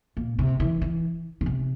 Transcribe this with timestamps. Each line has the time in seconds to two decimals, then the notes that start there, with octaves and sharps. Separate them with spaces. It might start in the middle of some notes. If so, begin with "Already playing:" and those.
0.17 A#2
0.39 C3
0.60 E3
0.81 E3
1.41 D3
1.46 C3